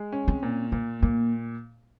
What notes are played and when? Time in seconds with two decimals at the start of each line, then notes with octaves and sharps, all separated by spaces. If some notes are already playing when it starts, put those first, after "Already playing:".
Already playing: G#3
0.12 C#4
0.28 C4
0.43 A#2
0.72 A#2 A#3
1.02 A#2 A#3